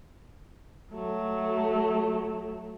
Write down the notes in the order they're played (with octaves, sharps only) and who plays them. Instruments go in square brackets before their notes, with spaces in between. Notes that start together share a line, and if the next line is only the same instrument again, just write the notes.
[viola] F#3 A3